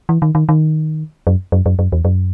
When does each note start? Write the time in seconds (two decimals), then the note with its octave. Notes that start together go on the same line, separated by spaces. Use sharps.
0.09 E3
0.22 D#3
0.35 D#3
0.49 D#3
1.27 F#2
1.52 F#2
1.66 F#2
1.79 F#2
1.92 E2
2.05 F#2